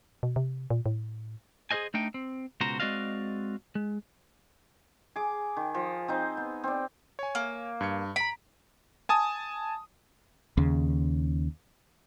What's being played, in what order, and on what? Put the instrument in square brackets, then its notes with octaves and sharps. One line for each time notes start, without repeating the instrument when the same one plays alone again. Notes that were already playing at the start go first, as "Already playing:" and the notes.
[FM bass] B2
C3
A#2
A2
[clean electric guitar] G#4 A4 C5 D#5 G#5
A3 D4 D#4 G5
C4
C#2 B2 F#4 C5 A#5
G#3 C4 F#4 D5 D#5 F5
G#3
[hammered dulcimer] G#4 D6
D#3
F3
C4 D#4 C5
B3
C4 D5
[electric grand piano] C#5 G#5
[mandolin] A#3
[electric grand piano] G2 G#6 C#7
[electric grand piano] A#5 D7 [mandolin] B5
[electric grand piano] G#5 A5 D#6
[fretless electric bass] D#2 C#3